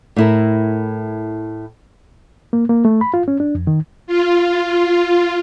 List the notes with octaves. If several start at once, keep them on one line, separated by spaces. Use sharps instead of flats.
A2 E4 A#4
A#3
A#3
A3
B5
F4
C#4
D4
F2
D#3
F4